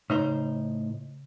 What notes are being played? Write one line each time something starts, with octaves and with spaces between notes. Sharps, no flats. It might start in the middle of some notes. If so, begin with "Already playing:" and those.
A2 C#3 D#4 C5